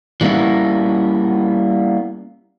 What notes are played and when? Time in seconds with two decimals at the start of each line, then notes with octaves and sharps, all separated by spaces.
0.21 E3 G3 A#3 B3 C#4 E4